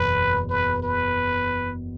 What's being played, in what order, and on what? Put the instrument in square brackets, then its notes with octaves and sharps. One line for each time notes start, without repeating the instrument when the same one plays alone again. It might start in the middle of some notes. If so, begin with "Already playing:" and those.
Already playing: [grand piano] F#1 E2 B2 [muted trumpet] B4
[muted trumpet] B4
B4